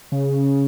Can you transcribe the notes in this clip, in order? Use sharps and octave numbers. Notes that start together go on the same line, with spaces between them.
C#3